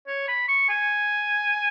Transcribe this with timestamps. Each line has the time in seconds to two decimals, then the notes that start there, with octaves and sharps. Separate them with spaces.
0.07 C#5
0.28 B5
0.48 C#6
0.69 G#5